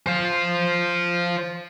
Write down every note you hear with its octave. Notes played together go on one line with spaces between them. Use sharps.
C5 F5